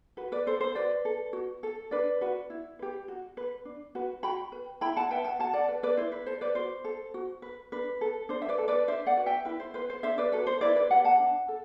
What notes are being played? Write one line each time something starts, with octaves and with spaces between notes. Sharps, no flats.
F#4 B4
B4 D5
A4 C5
C5
F#4 B4 D5
A4
F#4
A4
D4 B4 D5
F#4 B4
E4
G4 B4
F#4
B4
D4
F#4 B4
F#4 G5 B5
B4
E4 G5 B5
F#5 A5
B4 E5 G5
F#5 A5
F#4 F#5 A5
D5 F#5
B4
B4 D5
E4 C5
B4
A4 C5
B4 D5
F#4 C5
A4
F#4
B4
D4 B4
A4
D4 C5
E5
B4 D5
A4
B4 D5
D4 C5 E5
D5 F#5
F#4 B4
E5 G5
E4 B4
C5
B4 C5
C5
D4 C5 E5
B4 D5
F#4 A4 B4
C5
E4 B4 D5
B4 D5
G4 D5 F#5
B4
F#5 A5
D4
A4